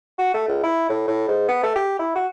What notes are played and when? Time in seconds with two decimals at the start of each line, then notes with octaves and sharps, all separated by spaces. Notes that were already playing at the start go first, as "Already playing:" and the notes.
0.18 F#4
0.34 A3
0.48 C#2
0.63 E4
0.89 A2
1.08 A2
1.28 G#2
1.48 B3
1.63 A3
1.76 G4
1.99 E4
2.15 F#4